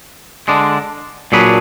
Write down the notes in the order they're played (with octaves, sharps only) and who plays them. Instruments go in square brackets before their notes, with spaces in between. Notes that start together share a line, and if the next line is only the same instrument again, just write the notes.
[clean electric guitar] D3 G#3 D4
A#2 F#3 D4 G#4 B4